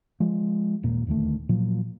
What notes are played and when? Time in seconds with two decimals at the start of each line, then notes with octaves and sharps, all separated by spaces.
0.20 F3 G#3
0.83 D#1 A#2 A#3
1.07 D#1 D2 D#3 A3
1.49 A#2 F3 F#3